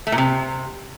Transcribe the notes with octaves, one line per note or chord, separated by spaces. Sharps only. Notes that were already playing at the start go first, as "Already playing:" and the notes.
A3
A#2
C3